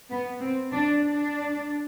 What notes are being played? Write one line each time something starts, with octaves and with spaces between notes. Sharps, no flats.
B3
C4
D4
D4